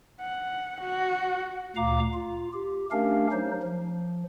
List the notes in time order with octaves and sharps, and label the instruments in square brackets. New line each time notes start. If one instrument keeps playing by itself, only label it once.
[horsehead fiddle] F#5
F#4
[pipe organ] D2 A#2 F5 A#5 D6
F4
G4
A3 C#4 D4 G4 A#4 F5
F#3 D#4 C5
F3